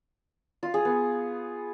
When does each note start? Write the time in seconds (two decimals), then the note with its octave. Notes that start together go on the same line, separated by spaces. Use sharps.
0.63 F4
0.74 G#4
0.85 B3